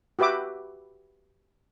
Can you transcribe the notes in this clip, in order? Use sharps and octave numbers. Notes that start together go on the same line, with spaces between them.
F#4 G4 B4 E5 D6